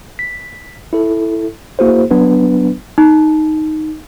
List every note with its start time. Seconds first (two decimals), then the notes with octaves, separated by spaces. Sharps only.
0.19 B6
0.93 E4 A4
1.79 A#3 E4 F#4 G#4 C5
2.11 F#3 B3 D4 B4
2.98 D#4